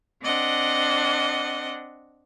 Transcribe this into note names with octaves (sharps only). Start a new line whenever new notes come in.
C4 D4 D#5 F#5